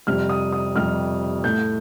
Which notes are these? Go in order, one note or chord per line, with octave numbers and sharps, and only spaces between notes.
F2 C3 G3 F6
D#6
D#6
F2 C3 G3 F6
A2 A3 G6